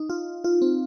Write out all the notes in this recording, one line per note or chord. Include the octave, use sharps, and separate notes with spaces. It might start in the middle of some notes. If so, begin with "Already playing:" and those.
Already playing: D#4
F4
F4
C4